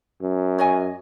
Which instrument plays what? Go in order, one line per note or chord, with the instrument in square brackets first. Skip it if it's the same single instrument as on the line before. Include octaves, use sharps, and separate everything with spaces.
[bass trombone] F#2
[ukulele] C#5 D#5 G#5